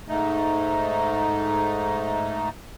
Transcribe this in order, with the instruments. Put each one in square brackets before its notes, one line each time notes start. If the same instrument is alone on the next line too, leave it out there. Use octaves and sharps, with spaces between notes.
[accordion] G#2 A3 D#4